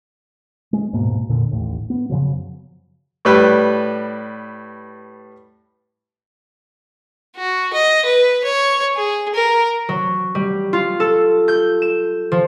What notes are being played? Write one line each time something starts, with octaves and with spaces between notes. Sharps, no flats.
G#3
D#1 G#2 B2 A#3
F2 A#2 D3
A1 D#2 A2
B3
F#2 C#3 F3 F#3
A2 G3 B4
F#4
D#5
B4
C#5
G#4
A#4
F#3
G3
F4
A4
G6
E7
F3